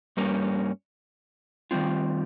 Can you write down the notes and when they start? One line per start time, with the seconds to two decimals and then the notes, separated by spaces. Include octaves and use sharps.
0.17 G2 G3 A#3 C#4
1.71 D#3 G3 C4 F4